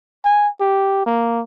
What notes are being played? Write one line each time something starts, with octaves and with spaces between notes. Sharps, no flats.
G#5
G4
A#3